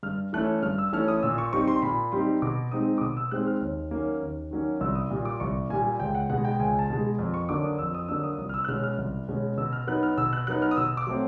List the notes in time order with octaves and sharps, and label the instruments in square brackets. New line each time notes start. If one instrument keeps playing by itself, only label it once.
[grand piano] G2 F6
E3 A3 C#4 F#6
G2 F6
E6
E3 A3 C#4 F6
D#6
A#2 E6
C#6
G3 C4 D#4 C#6
C6
A#2 B5
G3 C4 D#4 C6
B2 D6
G#3 C4 D#4 D#6
D6
B2 D#6
E6
G#3 C4 D#4 F#6
F6
D#2
D#3 F#3 A#3 C#4
D#2
D#3 F#3 A#3 C#4
C2 E6
D#6
A#2 G3
D6
C2 C#6
A#2 G3 G#5
C#2 G5
F#5
B2 G#3 F#5
G5
C#2 G#5
A5
B2 G#3
F2
C#6
D3 F#3 A#3 D4 D6
D#6
F2 E6
D#6
D3 F#3 A#3 D4 E6
D#6
C2 D#6
F6
E6
F#6
B2 G#3 C#4 F6
F6
C2
B2 G#3 C#4
B2 E6
F6
F#3 B3 D#4 F#6
F6
B2 E6
F#6
F#3 B3 D#4 F#6
F6
D#6
B2 E6
D6
F#3 A3 C4